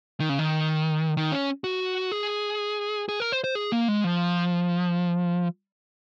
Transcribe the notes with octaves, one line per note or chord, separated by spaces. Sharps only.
D#3
C#3
D#3
D#3
C#4
F#4
G#4
G#4
A#4
C5
C5
G#4
A#3
G#3
F3